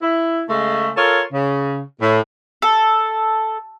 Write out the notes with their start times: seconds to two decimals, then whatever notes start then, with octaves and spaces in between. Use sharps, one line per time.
0.01 E4
0.49 C#3 G#3 A3
0.97 F4 A4 A#4 C#5
1.33 C#3
2.01 A2
2.62 A4